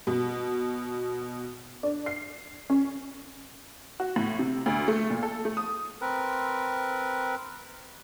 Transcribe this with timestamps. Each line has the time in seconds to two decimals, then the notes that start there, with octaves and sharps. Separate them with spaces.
0.07 B2
1.83 D4
2.06 C7
2.70 C#4
4.00 F#4
4.16 A2
4.39 C3
4.66 D2
4.88 A3
5.10 A#2
5.23 A4
5.45 A3
5.57 D#6
6.01 C4 A#4 B4